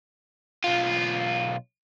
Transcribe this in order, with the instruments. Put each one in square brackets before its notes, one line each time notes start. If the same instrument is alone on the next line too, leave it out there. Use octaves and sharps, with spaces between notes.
[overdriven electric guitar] B1 F4